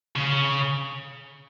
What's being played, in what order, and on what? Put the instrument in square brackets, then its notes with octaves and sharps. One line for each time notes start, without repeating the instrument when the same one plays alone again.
[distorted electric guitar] C#3